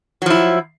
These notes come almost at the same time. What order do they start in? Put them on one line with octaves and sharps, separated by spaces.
F#3 F3 E4